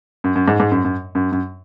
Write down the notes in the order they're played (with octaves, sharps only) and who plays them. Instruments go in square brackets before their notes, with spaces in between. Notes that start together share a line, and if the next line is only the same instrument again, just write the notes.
[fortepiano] F#2
F#2
G#2
G#2
F#2
F#2
F#2
F#2